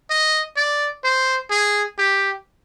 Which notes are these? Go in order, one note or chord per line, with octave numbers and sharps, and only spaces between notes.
D#5
D5
C5
G#4
G4